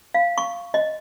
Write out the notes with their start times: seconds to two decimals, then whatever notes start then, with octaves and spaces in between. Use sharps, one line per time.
0.14 F5
0.38 C#6
0.74 D#5